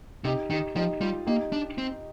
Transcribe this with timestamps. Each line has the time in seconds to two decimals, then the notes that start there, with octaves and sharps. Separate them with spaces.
0.24 C3 D#4 G4
0.50 D#3 D#4 G4
0.76 F3 D#4 G4
1.01 G3 F4
1.27 A#3 D#4 G4
1.52 D4
1.78 C4